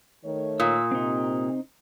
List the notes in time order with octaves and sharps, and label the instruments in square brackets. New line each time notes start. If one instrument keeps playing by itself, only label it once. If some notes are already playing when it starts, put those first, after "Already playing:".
[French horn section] D#3 A3 C#5
[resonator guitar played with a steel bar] A#2 [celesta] D#6 [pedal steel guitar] E6
[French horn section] C3 [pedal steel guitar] C4 D#4